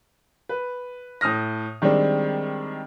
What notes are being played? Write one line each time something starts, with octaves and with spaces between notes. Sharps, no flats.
B4
A2 D#6 F6 A#6
D#3 G3 G#3 C4 D4